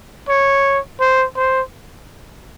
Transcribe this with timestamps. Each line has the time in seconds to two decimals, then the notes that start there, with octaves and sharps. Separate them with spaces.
0.29 C#5
1.00 C5
1.36 C5